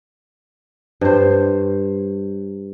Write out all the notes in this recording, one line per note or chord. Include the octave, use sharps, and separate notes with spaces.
G2 C5